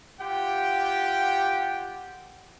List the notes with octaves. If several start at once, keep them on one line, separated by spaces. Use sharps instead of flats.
F4 G4 F#5 G5